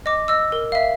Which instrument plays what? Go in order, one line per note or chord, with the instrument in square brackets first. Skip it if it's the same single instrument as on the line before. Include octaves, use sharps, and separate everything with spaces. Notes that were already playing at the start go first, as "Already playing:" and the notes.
[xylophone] D#5 D6
D#5 E6
A#4
E5 F5